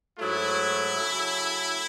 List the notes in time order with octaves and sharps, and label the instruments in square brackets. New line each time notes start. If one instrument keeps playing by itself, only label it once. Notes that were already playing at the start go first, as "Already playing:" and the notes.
[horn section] G#2 F#3 A3 E4
C#3 F#3 A3